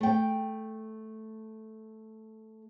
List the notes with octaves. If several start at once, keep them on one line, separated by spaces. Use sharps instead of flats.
A3 G5